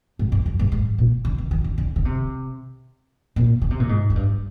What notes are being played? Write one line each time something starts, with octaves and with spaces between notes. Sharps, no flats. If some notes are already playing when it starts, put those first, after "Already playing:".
G#2
G2
F2
G2
G#2
A#2
D3
D#3
D#3
D3
D3
D3
C3
A#2
D3
C3
A#2
G#2
G#2
G2